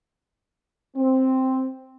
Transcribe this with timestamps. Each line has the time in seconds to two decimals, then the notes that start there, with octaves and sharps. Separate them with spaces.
0.96 C4